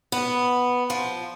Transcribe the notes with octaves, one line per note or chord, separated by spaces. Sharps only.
B3
F3